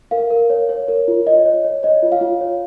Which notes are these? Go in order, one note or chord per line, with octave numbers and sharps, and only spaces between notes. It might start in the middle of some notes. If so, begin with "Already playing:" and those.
A#4 F5
A#4
C#5
C#5
A#4
F4
C#5 D#5
C#5
C#5
C#5 D#5
F4
F5
F4
C#5